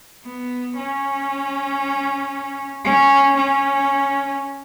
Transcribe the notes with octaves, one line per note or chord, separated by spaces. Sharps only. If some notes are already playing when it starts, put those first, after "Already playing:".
B3
C#4
C#4
C#4